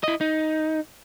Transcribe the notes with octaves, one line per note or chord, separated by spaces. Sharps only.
E4 D#5
D#4